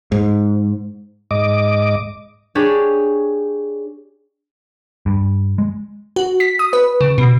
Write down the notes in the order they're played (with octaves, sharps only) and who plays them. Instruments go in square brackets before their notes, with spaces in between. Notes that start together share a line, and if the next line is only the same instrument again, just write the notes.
[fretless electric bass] G#2
[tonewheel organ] G#2 D#5 D6
[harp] D4 G4 G#4 C#5
[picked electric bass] G2
G#3
[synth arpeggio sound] F#4
B6
D#6
B4
C#3
B2